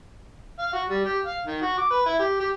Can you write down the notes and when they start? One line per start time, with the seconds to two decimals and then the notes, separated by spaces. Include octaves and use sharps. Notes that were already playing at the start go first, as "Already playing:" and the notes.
0.59 F5
0.73 F#4
0.90 G3
1.05 G4
1.26 F5
1.46 D#3
1.61 F#4
1.78 D6
1.91 B4
2.06 E4
2.19 G4
2.40 G4